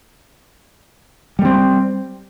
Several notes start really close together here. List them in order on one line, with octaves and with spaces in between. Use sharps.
G3 A3 C4